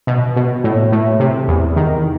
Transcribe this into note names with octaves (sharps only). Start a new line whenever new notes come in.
B2
B2
A2
A2
C3
E2
D#3